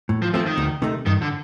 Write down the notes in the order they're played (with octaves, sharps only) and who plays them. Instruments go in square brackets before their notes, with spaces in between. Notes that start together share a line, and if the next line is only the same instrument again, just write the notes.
[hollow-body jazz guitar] A2
[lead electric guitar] F3
[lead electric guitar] F3 [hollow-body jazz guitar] A3 C4
[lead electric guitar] D#3
[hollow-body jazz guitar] D2
C3 D#3 A3 D#4
[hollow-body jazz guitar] G2 [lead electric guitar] D#3
[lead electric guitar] D3